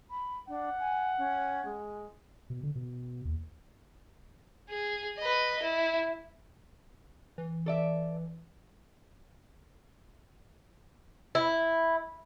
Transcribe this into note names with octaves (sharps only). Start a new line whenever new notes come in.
B5
D4 F#5
G#5
C#4
G#3
B2
D3
B2
D#2
G#4
B4 D#5
E4
E3
A4 D5 E5
E4